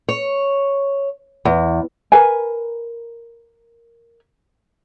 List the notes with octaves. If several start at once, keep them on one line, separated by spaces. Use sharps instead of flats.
C#5
E2
A#4 B4 G#5